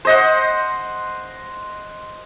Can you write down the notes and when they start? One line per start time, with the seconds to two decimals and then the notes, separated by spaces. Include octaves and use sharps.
0.05 C5 D#5 F#5